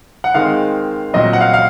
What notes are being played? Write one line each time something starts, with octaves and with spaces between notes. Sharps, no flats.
F#5
D#3 G#3 C4 F5
A#2 F#3 C4 D#5
F#5
F5
F5